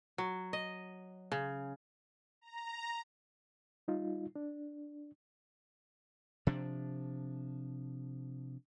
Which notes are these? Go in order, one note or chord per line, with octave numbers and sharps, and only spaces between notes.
F#3
D#5
C#3
A#5
G3 D#4 F4
D4
C3 F3 D4